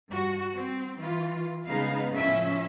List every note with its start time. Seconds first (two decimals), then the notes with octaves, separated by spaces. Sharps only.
0.11 G2 F#4
0.54 C4
0.96 E3 F4
1.68 C#3 G#3 B3 D#4 F5
2.11 A2 F3 C#4 E5